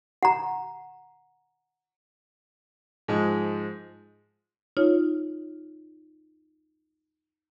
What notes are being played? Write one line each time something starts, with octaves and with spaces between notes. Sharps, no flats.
F#5 A#5
G#2 F3 G#3
D#4 F4 C#5